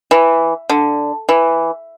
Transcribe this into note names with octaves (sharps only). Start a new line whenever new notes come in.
E3
D3
E3